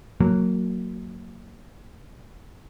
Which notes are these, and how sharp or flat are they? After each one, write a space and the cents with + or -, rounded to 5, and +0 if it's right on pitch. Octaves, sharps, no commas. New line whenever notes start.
F#3 +0 A#3 -15